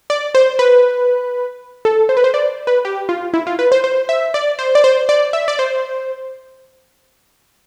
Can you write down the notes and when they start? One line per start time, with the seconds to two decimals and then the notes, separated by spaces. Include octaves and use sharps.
0.10 D5
0.35 C5
0.59 B4
1.85 A4
2.09 C5
2.17 B4
2.24 C5
2.34 D5
2.67 B4
2.85 G4
3.09 F4
3.34 E4
3.47 F4
3.59 B4
3.72 C5
3.84 C5
4.09 E5
4.34 D5
4.59 C5
4.75 D5
4.84 C5
5.09 D5
5.33 E5
5.48 D5
5.59 C5